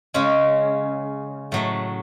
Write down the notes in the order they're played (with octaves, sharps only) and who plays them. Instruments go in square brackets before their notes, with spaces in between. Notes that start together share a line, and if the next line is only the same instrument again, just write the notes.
[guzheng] C#3 G#3 C#4
A2 F#3 A3